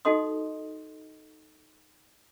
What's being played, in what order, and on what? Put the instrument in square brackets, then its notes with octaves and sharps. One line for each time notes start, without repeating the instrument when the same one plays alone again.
[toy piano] D#4 F#4 A4 D#5 C6 D#6